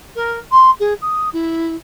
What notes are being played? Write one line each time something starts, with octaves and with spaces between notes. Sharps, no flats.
A#4
C6
G#4
D#6
E4